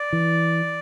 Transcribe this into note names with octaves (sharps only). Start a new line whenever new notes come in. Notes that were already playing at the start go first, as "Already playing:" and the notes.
Already playing: D5
E3